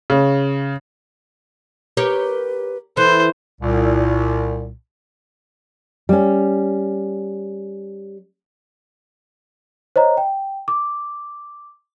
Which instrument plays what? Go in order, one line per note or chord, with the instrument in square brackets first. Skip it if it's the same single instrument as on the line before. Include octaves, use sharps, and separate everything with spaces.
[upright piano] C#3
[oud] G4 A#4 C#5 [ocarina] B4
[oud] E3 [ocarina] A4 [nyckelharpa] C5
[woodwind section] C2 A#2
[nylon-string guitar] G3 C#4
[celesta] C5 C#5 D#5 A#5
G5
D6